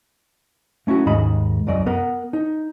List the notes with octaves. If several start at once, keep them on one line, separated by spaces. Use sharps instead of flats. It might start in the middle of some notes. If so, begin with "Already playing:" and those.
A3 C#4 E4 F#4
D#2 G#2 G#3 D#5 B5
C2 F#2 D5 D#5
B3 A#4 F#5
D#4